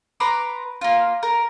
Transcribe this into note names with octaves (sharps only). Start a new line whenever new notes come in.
B4 A#5 C6 D6
A#3 F4
A#4